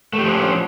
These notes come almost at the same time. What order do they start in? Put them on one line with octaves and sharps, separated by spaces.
A3 G4 F3 D4 C#4